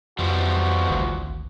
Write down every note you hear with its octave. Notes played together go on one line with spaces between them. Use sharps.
F2 E3 F3 G3 F#4
G#1 D2